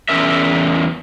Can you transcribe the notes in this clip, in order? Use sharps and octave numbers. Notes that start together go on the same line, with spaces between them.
E2 C#4 A#4 E5